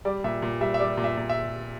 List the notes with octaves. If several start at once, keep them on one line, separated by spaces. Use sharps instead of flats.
G3 D5
A#2 E5
A#2
G3 E5
E5
G3 D5
A#2
E5
A#2
E5